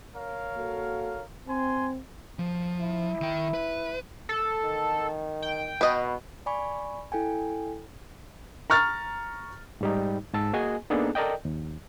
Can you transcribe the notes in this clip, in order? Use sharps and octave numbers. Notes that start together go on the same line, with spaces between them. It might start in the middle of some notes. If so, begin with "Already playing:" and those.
A#4 C#5 F5
A#3 F#4 A4
C4 G#5 C6
F3
E4
D#3 G5
B4
A4
D#3
G5
B2 B4 D#5
D5 G#5 B5 C#6
E4 A4 G5 G#5
A#5 C#6 F6 A6
G#2 G3 D#4
G#2 A5 E6
A#3 F#4 G#4 D#5 G#5
A#3 B3 D4 D#4 G#4 A4
A4 A#4 D5 D#5 G5
D#2